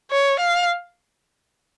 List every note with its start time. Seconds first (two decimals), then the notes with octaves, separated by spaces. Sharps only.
0.11 C#5
0.40 F5